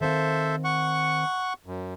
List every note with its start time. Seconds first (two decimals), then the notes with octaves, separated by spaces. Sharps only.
0.01 D#3 C4 A4 C5 E5 F5
0.64 F#5 C#6
1.66 F#2